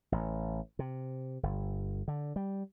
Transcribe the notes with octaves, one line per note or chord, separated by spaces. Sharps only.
A1
C3
G1
D3
G3